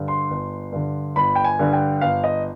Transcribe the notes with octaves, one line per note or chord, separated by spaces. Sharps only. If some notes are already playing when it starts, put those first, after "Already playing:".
Already playing: G2 D3
C6
G1
G2 D3
G1 B5
G5
G#5
G2 D3
G5
G1 F5
D#5